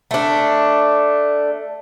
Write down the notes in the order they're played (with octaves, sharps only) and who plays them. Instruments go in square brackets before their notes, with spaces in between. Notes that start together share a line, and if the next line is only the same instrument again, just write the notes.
[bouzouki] A3 D4